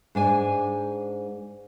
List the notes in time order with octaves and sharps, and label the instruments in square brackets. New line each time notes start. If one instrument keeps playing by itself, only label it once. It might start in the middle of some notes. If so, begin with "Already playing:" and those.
[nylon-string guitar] G#2 D4 G#5